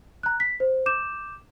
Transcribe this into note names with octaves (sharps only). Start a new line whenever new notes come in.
A#5 F#6
B6
C5
D6 G6 E7